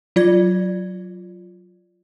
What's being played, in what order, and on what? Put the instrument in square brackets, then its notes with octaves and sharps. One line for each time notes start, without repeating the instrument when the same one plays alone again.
[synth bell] F#3 F4 D5 G#6